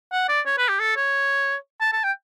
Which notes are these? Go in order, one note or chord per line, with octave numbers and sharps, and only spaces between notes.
F#5
D5
C#5
B4
G4
A4
C#5
A5
A5
G5